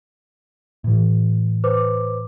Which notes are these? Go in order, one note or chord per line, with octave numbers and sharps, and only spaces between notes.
A2 E3
B4 C5 D6